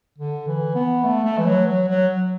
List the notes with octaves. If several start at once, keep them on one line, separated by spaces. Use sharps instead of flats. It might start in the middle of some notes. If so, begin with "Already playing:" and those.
D3
E3
B3
A3
A3
E3
F#3
F#3
F#3